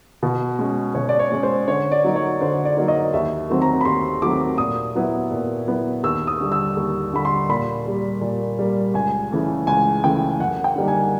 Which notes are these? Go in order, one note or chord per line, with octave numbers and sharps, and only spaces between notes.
B2
G#3 C#4
B2 C#5
D5
C#5
G#3 C#4
C5
D3 C#5
D5
F#3 A#3 D#4
C#5
D3 C5
D5
F#3 A#3 D#4
D#5
D#2 E5
D#3 F#3 A3 C4
A#5
B5
D#2 C6
D#3 F#3 A3 C4 D6
A#2 D#6
F#3 B3 E4
A#2
F#3 B3 E4
D#2 E6
D#6
D3 G3
E6
D#2
D3 G3 B5
C6
A#2 B5
G3 A#3
A#2
G3 A#3
C#2 G#5
C#3 E3 A3
C#2 G#5
C#3 E3 A3 G5
F#2 F#5
G5
D3 G3 A#3 D#4
G#5